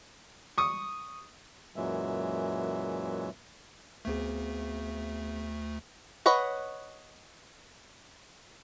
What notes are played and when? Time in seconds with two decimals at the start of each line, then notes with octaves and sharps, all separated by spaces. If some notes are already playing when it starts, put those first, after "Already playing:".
0.58 C#6 D#6
1.76 F#2 A#2 E3 F#3 G#3 E5
4.05 D2 A3 B3 C4 G#4
6.26 B4 C#5 D#5 F#5